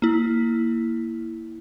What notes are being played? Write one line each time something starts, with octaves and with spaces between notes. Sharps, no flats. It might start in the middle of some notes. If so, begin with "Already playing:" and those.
A#3 E4